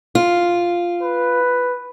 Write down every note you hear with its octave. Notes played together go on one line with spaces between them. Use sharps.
F4
B4